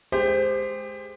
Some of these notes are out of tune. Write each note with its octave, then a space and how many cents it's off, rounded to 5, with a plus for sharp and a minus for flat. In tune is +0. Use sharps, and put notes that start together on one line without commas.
G#3 +20 G4 +30 C5 -10